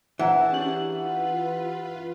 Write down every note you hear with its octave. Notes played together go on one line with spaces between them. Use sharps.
E3 D4 G#4 E5 F#5 A5 A#5
C#4 G4 F#7
F4 B4